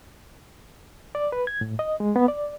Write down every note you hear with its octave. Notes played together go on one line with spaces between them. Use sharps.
D5
B4
G#6
A2
D#5
G#3
B3
D5